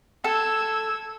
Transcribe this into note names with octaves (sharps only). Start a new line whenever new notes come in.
A4 E6 G#6